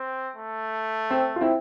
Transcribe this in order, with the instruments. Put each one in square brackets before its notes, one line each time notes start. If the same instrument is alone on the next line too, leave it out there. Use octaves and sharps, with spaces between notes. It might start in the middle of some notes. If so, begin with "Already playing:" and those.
Already playing: [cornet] C4
A3
[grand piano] C4
F4
C4 E4